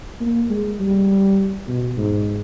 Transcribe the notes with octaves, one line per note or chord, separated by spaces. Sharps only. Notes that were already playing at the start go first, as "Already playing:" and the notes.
A#3
G#3
G3
B2
G#2